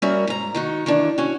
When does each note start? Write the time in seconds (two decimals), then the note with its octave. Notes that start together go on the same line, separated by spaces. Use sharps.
0.02 G3 C#4 F#4 A#4 E5
0.27 G#2 A#5
0.54 D#3 D#4 F#4
0.86 D#3 E3 D4
1.18 C#4 F#4